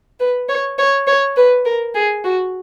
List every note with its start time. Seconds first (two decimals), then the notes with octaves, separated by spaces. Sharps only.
0.20 B4
0.49 C#5
0.79 C#5
1.07 C#5
1.36 B4
1.65 A#4
1.94 G#4
2.24 F#4